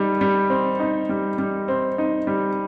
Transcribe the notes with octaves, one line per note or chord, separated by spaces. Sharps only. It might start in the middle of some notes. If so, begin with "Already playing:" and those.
Already playing: G3 D#4
G3
C4
D#4
G3
G3
C4
D#4
G3